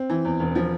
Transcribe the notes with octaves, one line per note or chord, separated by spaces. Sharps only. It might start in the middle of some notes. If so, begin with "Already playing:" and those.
Already playing: C4
E3
E2
E1
F3